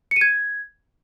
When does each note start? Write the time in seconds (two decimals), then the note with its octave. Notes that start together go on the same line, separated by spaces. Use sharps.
0.11 C#7
0.16 D#7
0.21 G#6